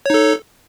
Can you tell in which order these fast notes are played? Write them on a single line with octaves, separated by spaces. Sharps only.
C#5 D#4 A4